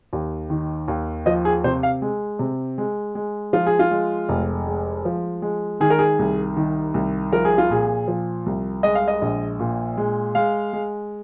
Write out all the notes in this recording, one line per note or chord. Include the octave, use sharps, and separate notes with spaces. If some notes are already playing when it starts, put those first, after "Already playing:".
D#2
D#3
D#2
F3 D#5
G#4
C3 C5
F5
G#3
C3
G#3
G#3
F3 F4
G#4
F4
G#3
F1
G#3
F3
G#3
D#3 G#4
A#4
G#4
C2
D#3
C2
F3 A#4
G#4
F4
A#2 G#4
F3
C2
G#3 D#5
F5
D#5
A#1
A#2
G#3
G#3 F5
G#3